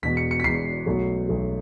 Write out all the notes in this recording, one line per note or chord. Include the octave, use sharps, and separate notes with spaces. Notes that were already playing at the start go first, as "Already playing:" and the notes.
E1 E2 B2 B6
C#7
C#7
B6
E1 E2 B2 C7
B1 B2 F#3 A3
B1 B2 F#3 A3